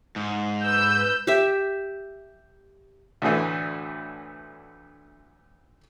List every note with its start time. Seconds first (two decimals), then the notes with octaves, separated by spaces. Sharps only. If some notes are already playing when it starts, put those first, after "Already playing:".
0.16 G#2
0.62 B4 E6 G6
1.27 G4 E5
3.22 D2 A2 D3 E3